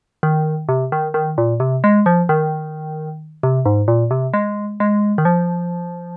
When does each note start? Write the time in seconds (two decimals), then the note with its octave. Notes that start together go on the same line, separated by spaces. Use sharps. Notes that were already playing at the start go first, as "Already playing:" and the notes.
0.23 D#3
0.69 C3
0.92 D#3
1.14 D#3
1.38 A#2
1.60 C3
1.84 G#3
2.06 F3
2.29 D#3
3.43 C3
3.66 G#2
3.88 A#2
4.11 C3
4.34 G#3
4.80 G#3
5.18 D#3
5.25 F3